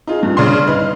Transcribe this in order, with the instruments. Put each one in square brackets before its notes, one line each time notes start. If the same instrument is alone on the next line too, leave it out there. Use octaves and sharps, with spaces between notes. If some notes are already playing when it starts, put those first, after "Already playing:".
[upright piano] D#4 F4 G#4
G2
[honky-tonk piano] C#3 D4 C6
[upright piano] D#4 B4 [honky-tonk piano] F6